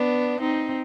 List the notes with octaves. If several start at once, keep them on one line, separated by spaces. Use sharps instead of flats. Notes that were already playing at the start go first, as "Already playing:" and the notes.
Already playing: B3 D4
C4 D#4